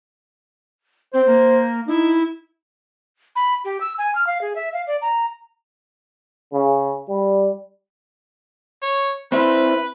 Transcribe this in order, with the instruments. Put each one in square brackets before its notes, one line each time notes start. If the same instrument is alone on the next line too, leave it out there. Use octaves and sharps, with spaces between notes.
[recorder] C4 [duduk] C5
[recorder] A#3
[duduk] D#4 [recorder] E4
[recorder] B5
G4
E6
G#5
F6
F5
G#4
E5
F5
D5
A#5
[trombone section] C#3
G3
[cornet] C#5
[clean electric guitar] C4 E4 [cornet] B4